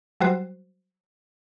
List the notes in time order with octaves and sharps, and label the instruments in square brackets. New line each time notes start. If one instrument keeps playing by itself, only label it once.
[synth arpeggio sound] F#3 G3 F#4 C5